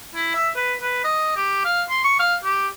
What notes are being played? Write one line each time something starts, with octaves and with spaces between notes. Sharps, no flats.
E4
E5
B4
B4
D#5
G4
F5
C6
C#6
F5
G4